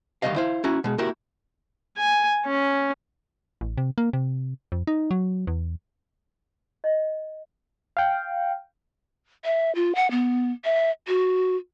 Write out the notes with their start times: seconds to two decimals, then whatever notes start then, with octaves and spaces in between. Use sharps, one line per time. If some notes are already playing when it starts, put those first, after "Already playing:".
0.22 D2 D#3 F#3 G3 D#5 F5
0.36 E4 C5 F5
0.64 C#4 E4 F#4 A#5
0.84 B2 G#3
0.98 A#3 E4 F#4 G4 A#4
1.97 G#5
2.46 C#4
3.61 A1
3.78 C3
3.98 A#3
4.13 C3
4.72 F2
4.87 D#4
5.11 F#3
5.47 E2
6.84 D#5
7.97 F5 G5
9.45 E5
9.75 F4
9.95 F#5
10.11 B3
10.65 E5
11.08 F#4